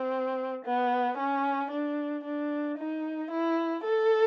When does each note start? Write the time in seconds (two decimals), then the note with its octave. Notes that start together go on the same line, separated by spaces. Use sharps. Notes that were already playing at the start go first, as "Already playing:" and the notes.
Already playing: C4
0.65 B3
1.18 C#4
1.71 D4
2.24 D4
2.78 D#4
3.31 E4
3.84 A4